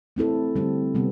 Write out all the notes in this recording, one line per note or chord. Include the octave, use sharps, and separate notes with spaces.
A3 C4 E4 A4
D3 G3 C4
C3 G3 B3